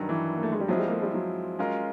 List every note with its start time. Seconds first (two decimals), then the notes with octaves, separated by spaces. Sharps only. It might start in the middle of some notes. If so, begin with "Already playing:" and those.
Already playing: G2 D#3 F#3
0.09 E3
0.35 A#3
0.43 A3
0.52 G#3
0.60 G3
0.68 F3 F#3 G#3 C4 E4
0.79 G3
0.87 A#3
0.91 A3
1.02 G3
1.14 F#3
1.59 G#3 C#4 F4 A#4